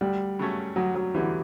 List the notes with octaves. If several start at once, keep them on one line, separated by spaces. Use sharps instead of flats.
D2 G3
C#3 F#3 A3 C#4
D2 F#3
F#3
D3 E3 G3 B3